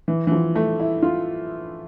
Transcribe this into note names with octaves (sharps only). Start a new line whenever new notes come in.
E3
E3
F3
A3
E4
F4